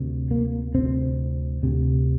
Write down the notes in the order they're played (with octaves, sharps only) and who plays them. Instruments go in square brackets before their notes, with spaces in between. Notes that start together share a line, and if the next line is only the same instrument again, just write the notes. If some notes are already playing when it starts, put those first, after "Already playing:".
Already playing: [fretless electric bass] D2 C3
A#3
D2 C3 C4
D2 C3